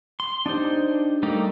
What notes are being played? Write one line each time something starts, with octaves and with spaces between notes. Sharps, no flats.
C6
D4 D#4 G4 C5
G3 A3 A#3 D#4 G4